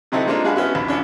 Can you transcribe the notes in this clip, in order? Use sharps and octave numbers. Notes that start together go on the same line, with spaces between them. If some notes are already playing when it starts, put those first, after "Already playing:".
C3 F#3 C4 D#4 E4 A4
G#3 A#3 C4 D4 D#4 F4
G#3 D4 F#4 G#4 F5 B5
B3 C#4 E4 F#4
A#1 D#2 B5
A1 B2 C#4 D4